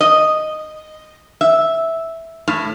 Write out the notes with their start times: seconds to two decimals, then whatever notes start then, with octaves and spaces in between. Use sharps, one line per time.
0.01 D#5
1.41 E5
2.48 A2